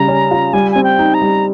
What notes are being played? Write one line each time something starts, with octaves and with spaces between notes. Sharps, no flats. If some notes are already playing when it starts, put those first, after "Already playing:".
Already playing: C#3 G3 A#5
C#4
F4
G3 G#5
C4 G#5
G5
D#4
A#5
G3